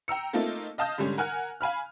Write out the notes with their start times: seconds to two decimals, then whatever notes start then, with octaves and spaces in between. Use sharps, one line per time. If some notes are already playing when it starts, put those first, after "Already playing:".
0.08 G5 A#5 E6 C#7
0.33 A3 A#3 C4 D#4 F4 A4
0.78 D#5 F5 A5 D#6 G6
0.98 G#2 D3 G3 C#4
1.18 A#4 F#5 G#5 F6 F#6
1.61 F5 G#5 B5 F6